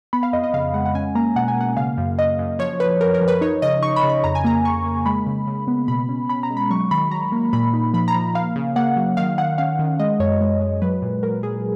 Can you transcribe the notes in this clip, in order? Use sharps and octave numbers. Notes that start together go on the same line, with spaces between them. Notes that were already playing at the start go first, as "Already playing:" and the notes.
B3 B5
F5
F2 D#5
D#5
C#3 F5
G#3 F#5
F#5
C#4 G#5
A#3 A#5
B2 F#5
G#5
A#3 F#5
C#3 F5
F#2
F#2 D#5
F#2
F3 C#5
F3 B4
F#2 A#4
A#4
F3
B4
D#4 C#5
C#3 D#5
D#4 C#6
B5
C#3
B5
F2 A#5
G#5
A#3 A#5
A#3 C#6
A#3
G#3 B5
C#3
C#3
B3
B2 B5
C#4
C#4 B5
A#5
G#3
B5
F#3 C#6
D#3 B5
F#3 A#5
A#3
A#2 B5
D#4
F3 B5
A#5
F3
A#3 F5
C#3
A#3 F#5
F#3
D#3 F5
D#3 F#5
C#4 F5
D#3
G#3 D#5
F#2 C#5
G#3
G#3
F#3 B4
A#2
F#3 A#4
A#2 G#4